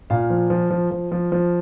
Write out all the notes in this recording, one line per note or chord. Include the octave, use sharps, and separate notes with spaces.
A#2 F5
F3
F3
F3
F3
F3
F3